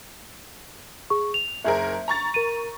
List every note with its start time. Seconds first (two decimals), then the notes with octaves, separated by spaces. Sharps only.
1.10 G#4 C#6
1.34 F7
1.64 F#1 G#4 A#4 E5
2.08 A#5 C#6 A6
2.34 A#4 D#7